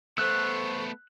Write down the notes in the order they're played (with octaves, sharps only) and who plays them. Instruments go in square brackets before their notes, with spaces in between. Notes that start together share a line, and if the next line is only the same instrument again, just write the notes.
[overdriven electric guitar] A3 B3 [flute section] A4 C5 C#6 [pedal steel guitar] E6 F#6